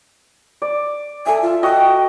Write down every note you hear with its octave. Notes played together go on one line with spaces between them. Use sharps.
D5
A4 E5 G#5
F4
F#4 D#5 G5